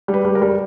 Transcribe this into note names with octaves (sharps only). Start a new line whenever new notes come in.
G3
B4
G3
A#4
G3